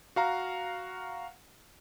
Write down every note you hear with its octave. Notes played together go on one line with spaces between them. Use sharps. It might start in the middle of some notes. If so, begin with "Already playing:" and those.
F#4 F5 A#5